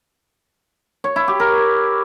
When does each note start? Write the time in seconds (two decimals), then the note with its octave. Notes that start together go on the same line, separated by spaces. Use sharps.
1.04 C#5
1.16 E4
1.28 G4
1.40 A#4